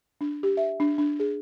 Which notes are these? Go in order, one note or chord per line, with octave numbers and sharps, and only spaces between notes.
D4
G4
E5
D4
D4
G#4